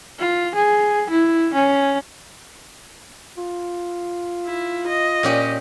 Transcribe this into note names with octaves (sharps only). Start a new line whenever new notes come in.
F4
G#4
E4
C#4
F4
E4
D#5
A#2 C#4 G4